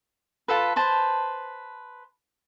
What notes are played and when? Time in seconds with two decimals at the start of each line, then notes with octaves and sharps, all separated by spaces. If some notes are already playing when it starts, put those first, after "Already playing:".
0.48 F4 A4 B4
0.76 B4 C5 A5